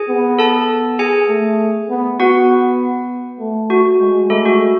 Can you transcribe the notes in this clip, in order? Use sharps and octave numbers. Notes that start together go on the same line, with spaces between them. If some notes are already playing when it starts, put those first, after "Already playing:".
Already playing: G#4 G#5
B3
A4 A5
G#4 G#5
A3
B3
B3 F#4 F#5
A3
F#4
G#3
G#3 A3 A4
F#4